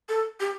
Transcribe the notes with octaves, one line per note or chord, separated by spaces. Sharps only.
A4
G4